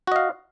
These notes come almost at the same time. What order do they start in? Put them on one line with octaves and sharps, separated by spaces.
F#4 D#5 F5